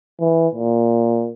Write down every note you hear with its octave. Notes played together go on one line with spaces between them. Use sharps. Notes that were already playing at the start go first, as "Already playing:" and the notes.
E3
A#2